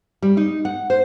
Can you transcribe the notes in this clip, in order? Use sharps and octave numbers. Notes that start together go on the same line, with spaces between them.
G3
D#4
F#5
C5